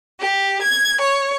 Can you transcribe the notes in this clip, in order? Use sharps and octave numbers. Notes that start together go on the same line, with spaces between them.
G4
G#6
C#5